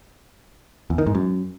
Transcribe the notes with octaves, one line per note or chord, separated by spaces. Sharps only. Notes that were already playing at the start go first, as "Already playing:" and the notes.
E2
D#3
G#2
F#2